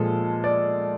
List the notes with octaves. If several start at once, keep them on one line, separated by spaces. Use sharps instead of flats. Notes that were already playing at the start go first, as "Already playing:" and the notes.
Already playing: A#2 F3 G#3 A4
D5